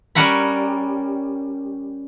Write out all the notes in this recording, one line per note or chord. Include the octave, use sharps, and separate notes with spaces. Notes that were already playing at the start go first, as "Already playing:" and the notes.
G3 C#4 A#4 F#5 B5